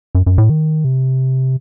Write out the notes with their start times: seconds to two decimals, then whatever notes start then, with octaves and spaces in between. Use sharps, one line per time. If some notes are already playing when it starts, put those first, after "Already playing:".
0.15 F#2
0.26 F#2
0.38 A2
0.49 D#3
0.84 C3